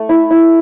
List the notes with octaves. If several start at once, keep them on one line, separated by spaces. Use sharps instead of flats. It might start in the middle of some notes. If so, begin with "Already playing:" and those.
Already playing: A3
E4
E4